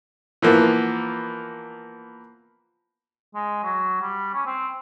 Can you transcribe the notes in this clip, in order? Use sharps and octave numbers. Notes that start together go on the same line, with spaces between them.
E3 F3 A#3 B3
G#3
F#3
G3
C#4
C4